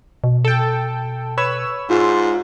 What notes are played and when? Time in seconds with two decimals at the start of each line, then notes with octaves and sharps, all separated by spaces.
0.24 B2
0.45 A4 G5
1.38 B4 C#5 E6
1.90 G#2 F4